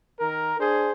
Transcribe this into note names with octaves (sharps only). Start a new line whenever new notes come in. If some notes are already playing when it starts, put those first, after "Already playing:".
D#3 A#4
D4 G#4 C5